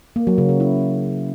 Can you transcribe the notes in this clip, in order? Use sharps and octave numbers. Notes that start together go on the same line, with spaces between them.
A#3
F#3
C#3
C#3
E4